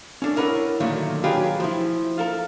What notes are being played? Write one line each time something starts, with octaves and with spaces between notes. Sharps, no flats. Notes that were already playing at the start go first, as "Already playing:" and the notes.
C#4 D4 A4
E4 A#4 B4 C#5 E5 F#5
A#2 D3 D#3 F#3 A3
D#3 F#3 F4 G4 G#4 B4
F3 E4
F4 A4 A#4